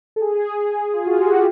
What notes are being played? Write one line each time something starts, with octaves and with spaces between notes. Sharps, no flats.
A4
G#4
F4
F#4
G4
G#4